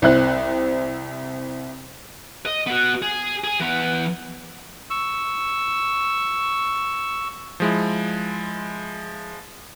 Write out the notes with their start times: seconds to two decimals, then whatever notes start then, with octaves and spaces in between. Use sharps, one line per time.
0.02 C2 C4 E4 F#6
2.46 D#5
2.67 B3 F#4
3.02 G#4
3.44 G#4 G#5
3.60 E3 B3
4.90 C#6 E6
7.60 F3 G#3 E4